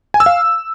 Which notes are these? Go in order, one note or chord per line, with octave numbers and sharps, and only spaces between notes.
G#5
E6
F5